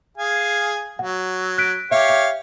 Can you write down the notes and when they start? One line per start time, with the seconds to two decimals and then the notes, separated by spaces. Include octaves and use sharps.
0.17 G#4 F5 G#5
0.99 F#3 F#5
1.58 F#6 B6 D7
1.91 G4 C#5 E5 F5
2.09 E5